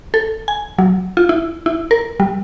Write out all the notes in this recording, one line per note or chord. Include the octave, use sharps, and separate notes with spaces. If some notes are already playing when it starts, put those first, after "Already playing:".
A4
G#5
F#3
F4
E4
E4
A#4
G3